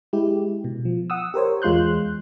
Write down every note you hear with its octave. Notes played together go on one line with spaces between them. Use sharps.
G#3 E4 G4
B2
F3
F#5 D#6 E6
G4 A#4 C5 C#5
E2 G#3 F4 C6 F#6 G6